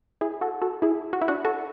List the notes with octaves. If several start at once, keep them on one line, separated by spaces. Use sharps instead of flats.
E4 G#4
F#4 A4
F#4 A4
E4 G#4
F#4
E4
D4 F#4
F#4 A4